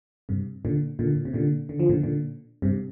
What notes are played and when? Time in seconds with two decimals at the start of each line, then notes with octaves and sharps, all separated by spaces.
0.29 G2 C3
0.65 A#2 D3
0.99 A#2 D3
1.15 A#2
1.25 C3
1.33 A#2 D3
1.69 D3
1.80 F3
1.89 A#2 D3
2.03 A#2 D3
2.62 G2 C3